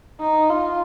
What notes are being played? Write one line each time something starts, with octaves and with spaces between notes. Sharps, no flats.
D#4
F4